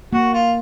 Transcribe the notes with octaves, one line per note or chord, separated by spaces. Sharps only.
A#3 F#4
F4